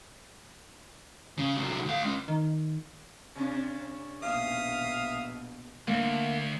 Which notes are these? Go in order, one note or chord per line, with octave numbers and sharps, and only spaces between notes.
C#3
C2 F#3
D2 F5
G#3 C#4
D#3
C3 C#4 D4
A#1 B2 E5 F5 D#6
D2 A#3